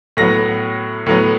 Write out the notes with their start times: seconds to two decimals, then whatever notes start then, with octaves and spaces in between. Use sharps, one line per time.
0.17 A2 F#3 B3 A#6
1.06 A2 F#3 B3